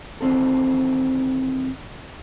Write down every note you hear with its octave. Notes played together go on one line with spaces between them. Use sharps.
D#3 E3 C4 A4